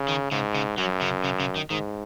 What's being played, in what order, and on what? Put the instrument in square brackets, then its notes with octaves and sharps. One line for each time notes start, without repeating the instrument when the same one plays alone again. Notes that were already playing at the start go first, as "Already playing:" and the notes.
Already playing: [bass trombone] C#3
[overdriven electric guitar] D#3
[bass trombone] G#2 [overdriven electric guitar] C#3
[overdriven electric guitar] C#3
[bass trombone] F#2 [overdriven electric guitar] F#3
[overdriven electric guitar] C#3
C#3
C#3
D#3
[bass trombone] G#2 [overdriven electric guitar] D#3